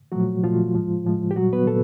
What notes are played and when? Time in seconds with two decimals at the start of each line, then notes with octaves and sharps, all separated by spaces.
0.12 A#2 F3 F#3 A3 F#4
0.44 A#2 F3 A3 F4
0.74 A2 F3 G#3
1.05 A2 F3 G#3
1.31 G4
1.36 A#2 F#3 G3 F#4
1.53 B3 B4
1.67 A#2 A4